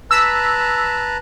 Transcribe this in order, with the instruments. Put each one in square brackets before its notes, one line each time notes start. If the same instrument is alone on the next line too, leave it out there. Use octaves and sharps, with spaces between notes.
[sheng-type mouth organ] B4 A5 A#5 [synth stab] E6 B6